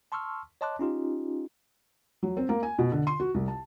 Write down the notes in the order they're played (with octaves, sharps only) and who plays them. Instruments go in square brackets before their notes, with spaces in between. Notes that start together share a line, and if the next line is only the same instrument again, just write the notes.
[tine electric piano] A5 C6 C#6 E6 F6
C#5 D#5 A5 C6 D6 F#6
C#4 D#4 F4 G4
[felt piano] F#3
C4
A#3
G#5
B2
D3
C6
F#4
C2
A5